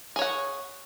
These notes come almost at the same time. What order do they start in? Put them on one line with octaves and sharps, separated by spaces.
G#4 C#5 F#5